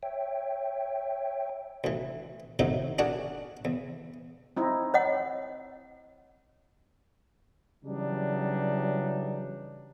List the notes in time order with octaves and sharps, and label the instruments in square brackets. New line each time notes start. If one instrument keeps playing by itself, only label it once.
[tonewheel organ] C#5 E5 G5
[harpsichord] D2 E3
F#2 A2 C3 D#3 F#3 D#4
D4 F#4 G#4 A#4 D5 F#5
E2
[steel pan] C4 D#4 E4
[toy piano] C#5 D#5 F#5
[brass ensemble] C#3 E3 F#3 G3 D4 D#4